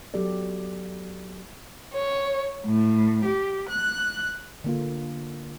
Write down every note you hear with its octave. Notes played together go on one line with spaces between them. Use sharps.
F#3 B3 G4 A4 D5
C#5
A2
G4
F#6
D3 A#3 F4